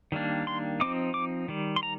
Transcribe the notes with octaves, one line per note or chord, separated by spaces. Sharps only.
D#3 G3 A#3 D4
C6
F3 C4 D#4 D6
D6
D#3 G3
C6
A#5